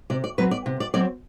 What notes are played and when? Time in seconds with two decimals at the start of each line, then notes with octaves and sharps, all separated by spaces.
0.10 C3 D5
0.24 D5
0.38 F#3 C4 B4
0.51 D5
0.66 C3
0.80 D5
0.94 F#3 C4 D5